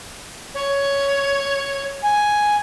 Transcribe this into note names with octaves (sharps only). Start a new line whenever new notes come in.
C#5
G#5